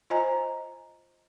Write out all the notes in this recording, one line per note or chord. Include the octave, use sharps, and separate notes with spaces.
F4 C5 D#5 G#5 A#5